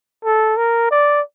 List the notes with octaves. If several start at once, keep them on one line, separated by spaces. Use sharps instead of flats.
A4
A#4
D5